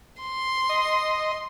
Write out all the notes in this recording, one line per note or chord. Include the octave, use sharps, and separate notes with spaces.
C6
D#5